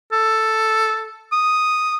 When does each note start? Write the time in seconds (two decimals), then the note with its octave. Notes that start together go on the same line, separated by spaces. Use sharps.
0.12 A4
1.32 D#6